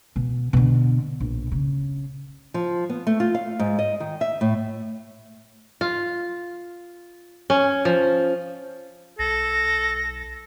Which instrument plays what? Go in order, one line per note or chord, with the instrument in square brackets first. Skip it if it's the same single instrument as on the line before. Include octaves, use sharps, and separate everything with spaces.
[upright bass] B2
B2 D3
A#1
C#3
[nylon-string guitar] F3
B3
A3
F4
F5
G#2
D#5
D#3
E5
A2
[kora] F4
C#4
F3
[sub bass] B1 [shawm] A4 [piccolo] A#6